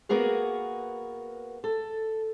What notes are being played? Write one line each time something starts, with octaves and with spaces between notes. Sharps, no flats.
A#3 B3 F#4 G#4 A#4
A4